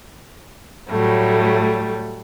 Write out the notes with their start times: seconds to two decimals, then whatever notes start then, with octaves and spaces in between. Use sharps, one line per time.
0.88 A2 F#3 G3 A3